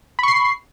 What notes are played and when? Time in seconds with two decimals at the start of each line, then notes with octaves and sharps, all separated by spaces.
0.19 B5
0.23 C#6
0.28 C7